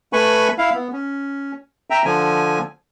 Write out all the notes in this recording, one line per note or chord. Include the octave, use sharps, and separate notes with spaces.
A3 B4 G#5 B5 C#6
E4 F5
B3
C#4
E5 G5 A#5
D3 F3 G#5